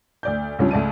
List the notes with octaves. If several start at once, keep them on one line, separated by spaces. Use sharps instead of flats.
D2 D5 G6
C#2 G3 C#4 D4 F4
C#2 A3 D5 A5 D#7